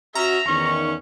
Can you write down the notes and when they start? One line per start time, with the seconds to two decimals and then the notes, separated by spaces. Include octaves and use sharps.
0.15 C#4 F#4 E5 A#5
0.48 E2 D#3 C#4 C#6